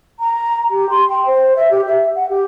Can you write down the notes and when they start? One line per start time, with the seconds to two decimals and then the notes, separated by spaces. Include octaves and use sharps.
0.19 A#5
0.71 G4
0.90 C6
1.09 G5
1.26 C5
1.56 E5
1.71 G4
1.85 E5
2.15 F#5
2.29 G4